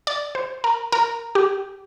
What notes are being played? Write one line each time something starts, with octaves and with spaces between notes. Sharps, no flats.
D5
C5
A#4
A#4
G4